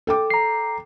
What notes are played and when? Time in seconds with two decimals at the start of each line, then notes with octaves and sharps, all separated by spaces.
0.07 A4 G5 D6
0.30 A#5 C7